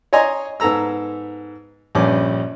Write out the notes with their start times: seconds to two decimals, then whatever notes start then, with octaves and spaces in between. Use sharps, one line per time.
0.13 C#5 D#5 G#5 A#5 C6
0.60 G#2 B3 A4 A#5 E6
1.95 A#1 G2 C#4 D6